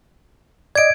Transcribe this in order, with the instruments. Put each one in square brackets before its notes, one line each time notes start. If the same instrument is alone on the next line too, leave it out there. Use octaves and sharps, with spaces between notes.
[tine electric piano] D5 D#5 [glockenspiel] G#6 D7